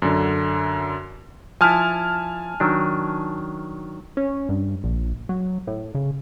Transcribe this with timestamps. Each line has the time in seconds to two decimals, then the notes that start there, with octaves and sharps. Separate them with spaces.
0.02 F#2 D3
1.61 F3 E4 G#5 A5 F6
2.60 D#3 F#3 D4
4.17 C#4
4.49 G2
4.84 A#1
5.29 F#3
5.67 A2
5.95 C#3